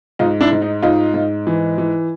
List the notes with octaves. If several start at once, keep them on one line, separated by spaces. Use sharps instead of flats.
G#2 D#4 F4
D4 E4
G#2
D#4
G#2 D#4 F4
G#2
E3
E3